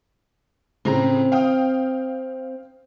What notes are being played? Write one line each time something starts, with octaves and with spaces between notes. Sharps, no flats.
A2 C#3 C4 A#5
F5 G5 D#6